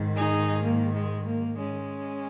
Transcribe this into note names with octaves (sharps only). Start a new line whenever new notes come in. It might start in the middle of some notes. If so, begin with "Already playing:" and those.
Already playing: G#2 D#3
D#4 G#4
A#3
G#3
A#3
G#3 C#4